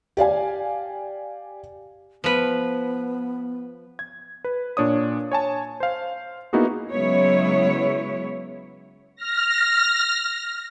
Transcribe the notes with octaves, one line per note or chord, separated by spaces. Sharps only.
G4 D5 F5 G#5
F3 B3 B4
G#6
B4
A#2 D4 C#5 D#6
C#5 G#5 A5
C5 F5
A#3 B3 D#4 E4 F#4 G#4
C#3 F#3 G#3 B3 E4 C#5
F6 A#6